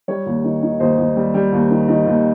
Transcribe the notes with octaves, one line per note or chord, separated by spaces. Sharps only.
G3 C#5
D#2
D#3
D#3
D#2 C5 D#5
D#2
G3
G3
D#2
D#3
D#3
D#2